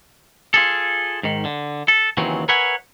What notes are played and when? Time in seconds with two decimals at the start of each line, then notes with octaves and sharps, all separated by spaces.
0.54 F4 G#4 A4
1.23 G#2 D#3
1.45 D3
1.88 A4
2.17 D#2 C#3 E3 F#3 C4
2.49 A#4 B4 C#5 E5 F#5 G#5